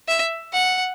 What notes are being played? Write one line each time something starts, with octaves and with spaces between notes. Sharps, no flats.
E5
F#5